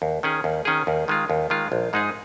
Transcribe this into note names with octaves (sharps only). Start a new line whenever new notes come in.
D#2
D#3 C#4 G#4
D#2
D#3 C#4 G#4
D#2
D#3 G#3 F4
D#2
D#3 G#3 F4
A#1
G#2 G#3 D#4 G#4